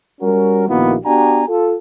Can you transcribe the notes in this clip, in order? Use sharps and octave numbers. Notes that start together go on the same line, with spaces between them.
G3 C#4 F#4 A#4
A#1 D#3 A#3 B3 E4 F#4
B3 D4 F#4 G4 G#5 A#5
F4 A4